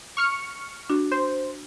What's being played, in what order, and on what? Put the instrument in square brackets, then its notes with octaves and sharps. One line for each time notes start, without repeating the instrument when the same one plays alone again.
[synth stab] C#6 F6 C#7
[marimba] D4 F#4
[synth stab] C5